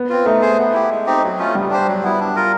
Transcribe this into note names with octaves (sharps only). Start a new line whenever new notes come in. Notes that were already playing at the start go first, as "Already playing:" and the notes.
Already playing: B3
C4 F4
A3 D#4
G#4 C5
B3
E4 G4
G#3
C4 D#4 G4
F#3
A3 C#4 F4
G3 B3
D4 G4 C5
F#3
B3 E4
D4
F4 A#4